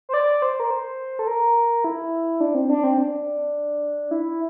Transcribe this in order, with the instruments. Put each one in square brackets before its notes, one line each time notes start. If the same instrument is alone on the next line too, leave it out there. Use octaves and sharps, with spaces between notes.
[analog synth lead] C5
D5
C5
A#4
C5
A4
A#4
E4
D4
C4
D4
C4
D4
E4